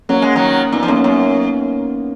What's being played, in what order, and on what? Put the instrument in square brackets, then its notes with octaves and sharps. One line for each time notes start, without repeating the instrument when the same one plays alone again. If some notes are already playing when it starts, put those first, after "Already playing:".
[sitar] F#3 [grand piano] A#3 C#4
[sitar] G#3
D#3 F#3
[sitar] A#2 [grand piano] B3 D#4
[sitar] F3
[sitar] F#2 [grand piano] A#3 C#4
[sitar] F#2